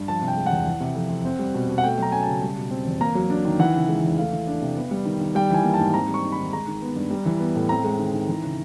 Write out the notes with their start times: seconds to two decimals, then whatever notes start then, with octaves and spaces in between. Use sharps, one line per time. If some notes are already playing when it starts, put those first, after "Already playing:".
Already playing: G2
0.08 F3 A5
0.22 C3
0.28 G5
0.37 G#3
0.46 F#5
0.52 E2
0.67 E3
0.80 C3
0.95 F2
1.10 F2
1.25 C4
1.39 G3
1.54 B2
1.69 B2
1.78 F#5
1.83 A3 G5
1.98 F#3 A#5
2.12 C#4 G#5
2.23 C#3 A5
2.42 G3
2.57 B2
2.71 C4
2.87 E2
3.01 A#3 A#5
3.15 F#3
3.30 D4
3.45 D#3
3.59 E3 F#5
3.75 C#3
3.89 G#3
4.04 E2
4.17 A3 F5
4.33 E3
4.47 D4
4.62 C3
4.77 B3
4.91 G3
5.05 D#3
5.21 D#3
5.35 G3 G5
5.50 E3 G#5
5.64 A#3
5.74 A5
5.79 G#2
5.94 C4 A#5
6.08 G3
6.14 C#6
6.23 D#4
6.32 B5
6.38 D#3
6.53 G#3 A#5
6.67 D#3
6.82 B3
6.96 G2
7.11 G3
7.26 E3
7.40 B3
7.56 A2
7.69 C4 A#5
7.84 G#3
7.99 D#3
8.13 D#3
8.28 E3
8.43 C#3